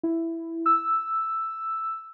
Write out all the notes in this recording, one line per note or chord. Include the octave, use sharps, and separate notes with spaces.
E4
E6